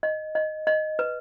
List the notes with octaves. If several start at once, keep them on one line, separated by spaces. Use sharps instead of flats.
D#5
D#5
D#5
B4